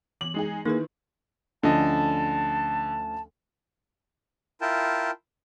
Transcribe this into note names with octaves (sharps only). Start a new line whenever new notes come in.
E3 B3 F#7
G#3 D#4 G#4
D#3 A#3 D#4 E4 G#4 B4
D2 D3 F3 C#4 D#5 A5
E4 F4 A#4 G5 A5